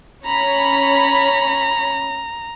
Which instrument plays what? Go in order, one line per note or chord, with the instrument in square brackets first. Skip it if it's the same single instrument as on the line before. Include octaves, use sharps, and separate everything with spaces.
[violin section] C#4 C#5 B5 [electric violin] A#5